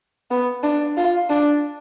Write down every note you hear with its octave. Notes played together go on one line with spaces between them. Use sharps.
B3
D4
F4
D4